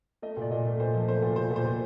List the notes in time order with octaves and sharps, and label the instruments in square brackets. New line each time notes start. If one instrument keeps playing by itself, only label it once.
[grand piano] A3 D#5
A#2 D5
A#2 D#5
A3
A#2 C5
F3
A3 C5
A#2
A#2 C5
A#2 C5
A#2